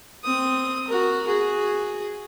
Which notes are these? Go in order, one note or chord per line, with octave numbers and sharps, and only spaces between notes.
C4 D#6
F#4 A#4
F#4 G#4